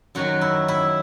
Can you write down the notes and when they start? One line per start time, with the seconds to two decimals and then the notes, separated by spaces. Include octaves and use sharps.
0.15 F#2 D#3 F#3 F#4
0.41 E4
0.68 E4